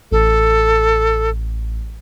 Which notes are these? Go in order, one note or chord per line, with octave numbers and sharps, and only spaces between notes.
A1 A4